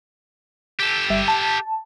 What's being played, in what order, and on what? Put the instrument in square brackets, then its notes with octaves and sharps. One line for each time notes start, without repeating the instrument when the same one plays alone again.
[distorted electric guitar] G4 A4
[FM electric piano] G1 G3 E5
A5